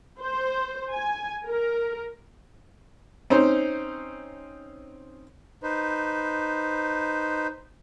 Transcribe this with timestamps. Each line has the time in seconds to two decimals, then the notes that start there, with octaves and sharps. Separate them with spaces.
0.20 C5
0.93 G#5
1.47 A#4
3.30 C4 C#4 D#4 C5
5.63 D#4 B4 C5